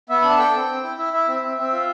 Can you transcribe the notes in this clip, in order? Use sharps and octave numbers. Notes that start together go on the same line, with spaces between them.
B3 E5
D4 B5
A5
A4 G5
C4
C4
E4
E4 E5
E4 E5
C4
C4
C4 E5
F4